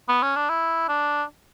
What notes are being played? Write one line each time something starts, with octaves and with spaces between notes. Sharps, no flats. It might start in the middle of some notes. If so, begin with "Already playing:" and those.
B3
C#4
D4
E4
D4